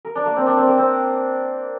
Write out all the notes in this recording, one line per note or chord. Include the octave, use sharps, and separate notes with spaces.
A#4
D4
A#3
C4
D4
C4
A#3
C4